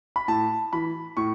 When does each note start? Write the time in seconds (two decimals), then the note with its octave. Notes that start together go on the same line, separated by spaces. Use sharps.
0.16 B5
0.28 A2 A5
0.73 E3 B5
1.17 A2 C#6